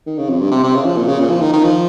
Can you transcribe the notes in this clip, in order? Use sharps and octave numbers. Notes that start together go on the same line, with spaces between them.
D#3
C#3
F2
G2
C3
C3
C#3
F3
A#2
C#3
A#2
F3
D#3
D#3
F3